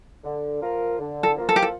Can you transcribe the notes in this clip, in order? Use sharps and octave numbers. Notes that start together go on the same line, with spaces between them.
D3
F3 A#3 F4 A#4
D3
A4
F3 A#3 F4 A#4
A4
G4
A4